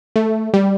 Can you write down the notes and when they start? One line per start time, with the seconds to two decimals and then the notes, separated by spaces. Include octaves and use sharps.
0.16 A3
0.54 G3